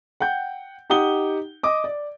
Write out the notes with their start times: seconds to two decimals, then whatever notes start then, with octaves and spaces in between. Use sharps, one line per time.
0.20 F#5 G5 G6
0.90 D#4 G4 F#5 D#6 G7
1.63 D#5 D6 D#6
1.84 D5